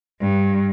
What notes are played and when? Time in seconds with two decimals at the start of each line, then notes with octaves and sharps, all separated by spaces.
0.20 G2